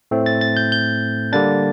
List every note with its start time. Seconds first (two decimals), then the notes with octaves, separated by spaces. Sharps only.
0.11 A2 A3 C4
0.26 A6
0.41 A6
0.57 G6
0.72 G6
1.32 D3 G3 A#3 D4 A6